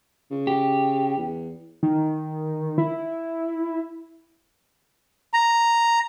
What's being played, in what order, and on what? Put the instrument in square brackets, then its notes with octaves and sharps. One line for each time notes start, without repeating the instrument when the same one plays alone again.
[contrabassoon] C#3
[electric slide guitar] G4
[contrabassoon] E2
[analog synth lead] D#3
E4
[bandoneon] A#5